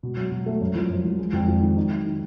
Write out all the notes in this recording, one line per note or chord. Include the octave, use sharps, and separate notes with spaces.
B2
F#3
B2
A3
F#2
F3
F#2
F3
G#3
F2
F2
D#3
D#4
F#3
D#3